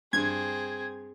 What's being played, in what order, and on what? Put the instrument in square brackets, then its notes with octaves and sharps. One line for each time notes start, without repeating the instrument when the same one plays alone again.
[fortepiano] G2 [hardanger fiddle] C4 G#4 [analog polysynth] G#6